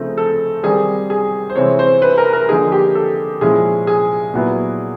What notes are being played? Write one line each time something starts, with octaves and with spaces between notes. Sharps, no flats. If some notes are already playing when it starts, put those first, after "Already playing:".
Already playing: C#3 F3 A3 C4 D#4
A4
D#3 G3 C4 G#4
G#4
C5
C3 E3 G#3 C4 E4 C#5
C5
B4
A#4
A#4
D3 F3 A#3 D#4 G#4
G4
A4
A#2 F3 G#3 C#4 E4 G#4
G#4
A#2 F#3 B3 E4